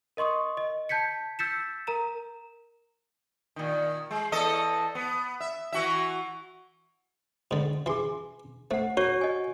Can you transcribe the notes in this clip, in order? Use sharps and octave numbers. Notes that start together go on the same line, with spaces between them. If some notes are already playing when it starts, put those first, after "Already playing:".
A#4 D#5 C6 C#6 D#6
D#5
A5 G6 G#6 B6 C#7
E6 G6 A6 B6 C#7 E7
A#4 A#5 E7
A#2 D#3
G#3
E2 A4 D#5
B3
E5
E3 F#4 E5
G#2 D3
E3 G#4 G#5 C6
A3 C5 F#5
F#4 A#4 C#5
D#5 G#5